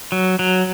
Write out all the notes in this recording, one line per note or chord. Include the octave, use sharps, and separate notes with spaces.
F#3
F#3